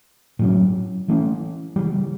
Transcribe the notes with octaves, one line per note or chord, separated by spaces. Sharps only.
A2 F#3 C#4
E3 A3 C#4
C#3 E3 G3